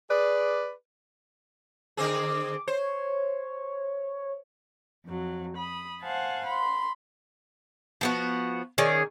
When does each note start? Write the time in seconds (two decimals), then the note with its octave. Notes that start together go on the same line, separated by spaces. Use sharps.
0.10 G#4 B4 D5
1.97 D3 C4 G#4 D6
2.68 C5 C#5
5.06 F2 F#3
5.56 B5 D#6
6.03 C5 F5 F#5 G#5 A5
6.47 B5 C6
8.01 F3 B3 F#4
8.78 D#3 C#4 G#4 D5